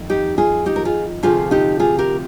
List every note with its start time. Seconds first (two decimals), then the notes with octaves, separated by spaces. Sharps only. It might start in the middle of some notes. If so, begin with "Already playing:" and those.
Already playing: F2 D#3
0.10 D#4 G4
0.38 F4 G#4
0.66 D#4 G4
0.76 A#4
0.85 F4 G#4
1.23 D2 C3 F3 F4 G#4
1.51 D#4 G4
1.80 F4 G#4
1.99 G4 A#4